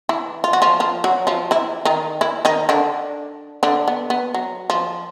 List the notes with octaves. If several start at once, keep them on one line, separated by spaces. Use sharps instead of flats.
E3 E4
F4
F#4
F3 F4
F3 F4
F#3 F#4
F3 F4
E3 E4
D#3 D#4
E3 E4
D#3 D#4
D3 D4
D3 D4
B3
B3
F#3
F3